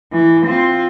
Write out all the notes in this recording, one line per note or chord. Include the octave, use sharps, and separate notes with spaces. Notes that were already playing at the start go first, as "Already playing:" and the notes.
E3
C4 F4